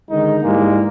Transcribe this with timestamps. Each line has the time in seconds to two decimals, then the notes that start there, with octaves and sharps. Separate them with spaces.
0.10 D3 D#3 G#3 D#4
0.43 G#2 E3 G3 G#3 A#3